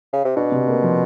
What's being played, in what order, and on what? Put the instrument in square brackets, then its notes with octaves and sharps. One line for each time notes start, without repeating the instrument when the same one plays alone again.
[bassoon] C#3
C3
[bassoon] B2 [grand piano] D4
[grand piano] C3
A#3
F3